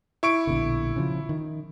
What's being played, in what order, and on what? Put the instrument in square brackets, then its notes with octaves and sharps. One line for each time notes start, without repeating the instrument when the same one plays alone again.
[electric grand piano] E4 C#6 D7
[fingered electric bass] A#1 B2 D3
C#3 E3 F3
D#3